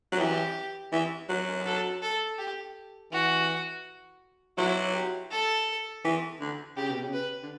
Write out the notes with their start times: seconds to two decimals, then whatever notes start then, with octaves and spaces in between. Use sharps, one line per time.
0.12 F#3
0.19 E3 G4
0.92 E3
1.29 F#3
1.66 A4
2.02 A4
2.38 G4
3.12 E3 F#4
4.58 F#3 E4
4.94 G4
5.31 A4
6.04 E3
6.40 D3
6.77 C#3 G4
6.90 B2
7.03 C#3
7.13 B4
7.42 D3